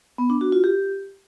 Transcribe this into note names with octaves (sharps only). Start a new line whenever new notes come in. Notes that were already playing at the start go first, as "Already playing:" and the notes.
B3
D4
F#4
F4
G4